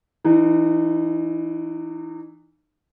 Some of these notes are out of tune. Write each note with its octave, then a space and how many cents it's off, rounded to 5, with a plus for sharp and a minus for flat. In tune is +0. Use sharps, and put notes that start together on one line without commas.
E3 +0 D#4 -35